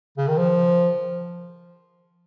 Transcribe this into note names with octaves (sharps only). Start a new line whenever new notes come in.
C#3
D#3
F3